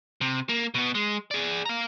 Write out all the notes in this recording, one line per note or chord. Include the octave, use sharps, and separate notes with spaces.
C3
A#3
B2 B3
G#3
G#4 D5
F5 A#5